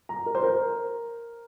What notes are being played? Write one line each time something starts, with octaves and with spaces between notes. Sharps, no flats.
A#5
A#4
C5
A#4